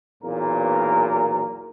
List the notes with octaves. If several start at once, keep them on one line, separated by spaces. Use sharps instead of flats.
B1 E2 A#2 A#3 A#4